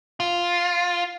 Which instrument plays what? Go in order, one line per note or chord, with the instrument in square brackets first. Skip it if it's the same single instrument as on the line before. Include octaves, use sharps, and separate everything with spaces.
[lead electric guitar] F4